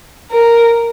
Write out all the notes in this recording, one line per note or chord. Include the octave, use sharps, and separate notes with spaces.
A#4